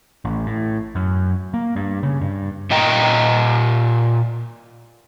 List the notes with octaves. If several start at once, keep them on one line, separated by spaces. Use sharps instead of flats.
A1
A2
F#2
A#3
G2
C#3
G2
A#2 D#5 G5 A#5